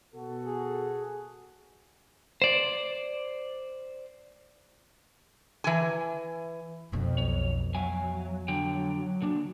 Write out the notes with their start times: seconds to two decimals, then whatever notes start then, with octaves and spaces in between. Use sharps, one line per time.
0.14 B2 F#4 A4
0.46 G#4
2.42 C5 D5
5.64 E3 G#5
6.92 F2 B2
7.18 B1 C#5
7.75 F#3 E5 F5 G#5
8.48 D3 F#3 G5
9.22 D3 A#3 D4